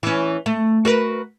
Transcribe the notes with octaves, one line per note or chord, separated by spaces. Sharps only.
E3 C#4
A3
F#4 A#4 B4